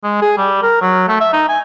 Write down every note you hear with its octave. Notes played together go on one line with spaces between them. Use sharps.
G#3
G#4
G3
A#4
F#3
A3
E5
D#4
G#5